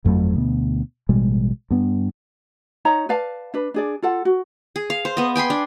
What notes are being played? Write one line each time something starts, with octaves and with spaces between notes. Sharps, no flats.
G1 F2 F#3 A3
D2 B2 B3
A1 B2 G3 G#3
G2 B3
D#4 C#5 A#5
B4 D5 F5 A5
D4 B4
D4 G#4 D5
F4 A4 F#5
F#4
G#4
F5
C5
B3 D#5
G5 G#5 B5 C6
D4